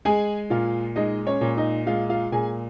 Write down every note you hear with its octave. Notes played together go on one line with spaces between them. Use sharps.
G#3 G#4 G#5
A#2 F4 F5
G#3 D#4 D#5
C#4 C#5
A#2
D#4 D#5
G#3 F4 F5
F4 F5
A#2 G#4 G#5